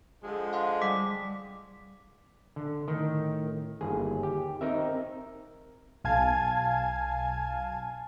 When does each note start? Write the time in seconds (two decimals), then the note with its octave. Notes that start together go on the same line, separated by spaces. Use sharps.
0.23 D3 F3 G#3
0.53 F5 F#5 C6
0.82 G3 D5 D6 B6
2.56 D3
2.88 A2 D#3
3.81 G1 D#2 G#4
4.23 G4
4.61 C4 D#4 A#4 E5
6.04 B1 F5 G#5 A5 G#6